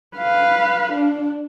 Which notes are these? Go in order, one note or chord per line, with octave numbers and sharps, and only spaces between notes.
B4 F5
D4